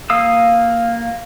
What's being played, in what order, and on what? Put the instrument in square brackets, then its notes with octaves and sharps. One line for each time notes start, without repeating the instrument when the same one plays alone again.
[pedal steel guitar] A#3 F5 D#6 E6